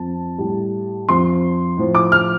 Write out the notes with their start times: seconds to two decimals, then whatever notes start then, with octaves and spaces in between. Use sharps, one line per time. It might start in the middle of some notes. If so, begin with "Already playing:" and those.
Already playing: F2 F3 A5
0.38 A2 G3
1.08 F2 F3 C6
1.77 A2 F3
1.95 D6
2.12 F6